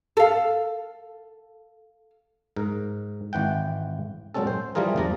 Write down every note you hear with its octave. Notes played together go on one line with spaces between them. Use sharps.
A4 F5
G#2 A#4
G#1 E3 F#5 G5
A#2 F#3 G#3 C4 C#4 A4
C5
E3 F3 G3 F4 G#4 A#4
E2 G2 F3 D5 A#5